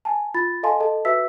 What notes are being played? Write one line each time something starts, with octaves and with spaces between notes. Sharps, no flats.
G#5 A5
F4 B5 A6
A4 D#5 F5 G#5 A5 C6
A4 D#5 A5
F#4 B4 E5 E6 B6